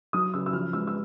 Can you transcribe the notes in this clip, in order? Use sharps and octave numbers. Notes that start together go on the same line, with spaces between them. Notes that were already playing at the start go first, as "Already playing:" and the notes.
F#3 D#6
C#3 E6
E6
F3 F6
G#3 E6
E6